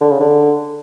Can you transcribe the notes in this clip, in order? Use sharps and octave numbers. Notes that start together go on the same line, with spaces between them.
D3
C#3
D3